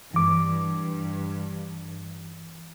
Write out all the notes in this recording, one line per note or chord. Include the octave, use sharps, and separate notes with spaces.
G2 E3 D6